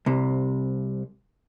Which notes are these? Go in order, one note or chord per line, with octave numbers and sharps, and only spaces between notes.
C2 C3